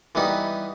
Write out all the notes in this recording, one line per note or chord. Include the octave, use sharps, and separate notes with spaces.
E3 G3 B3 D#4